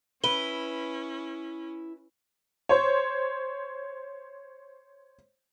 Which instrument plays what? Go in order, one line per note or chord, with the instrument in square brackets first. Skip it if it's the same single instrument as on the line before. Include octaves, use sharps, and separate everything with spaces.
[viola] C#4 [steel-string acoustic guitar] E4 [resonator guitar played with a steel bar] B4 [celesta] G7
[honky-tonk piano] C5 C#5